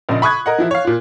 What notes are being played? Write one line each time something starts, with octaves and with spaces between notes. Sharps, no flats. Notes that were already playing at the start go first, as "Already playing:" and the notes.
A#1 C#3 D#5
B5 C#6 D#6 F#6 G#6
A#4 D#5 F#5
E3 F3 E4
C#5 F5
A#2 F4